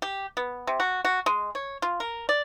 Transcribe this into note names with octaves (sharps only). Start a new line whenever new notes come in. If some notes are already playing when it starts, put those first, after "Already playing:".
G4
B3
C3
F#4
F#4
G#3
C#5
F4
A#4
D5